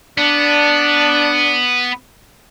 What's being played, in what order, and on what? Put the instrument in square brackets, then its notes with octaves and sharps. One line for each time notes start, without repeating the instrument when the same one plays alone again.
[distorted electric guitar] B3 [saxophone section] D4